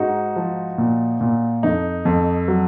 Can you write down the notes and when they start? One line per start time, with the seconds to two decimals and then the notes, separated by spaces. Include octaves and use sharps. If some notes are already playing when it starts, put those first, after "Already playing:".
Already playing: G#2 D#4 F#4
0.36 F3
0.78 A#2
1.21 A#2
1.63 F2 D#4
2.05 F2
2.48 F#3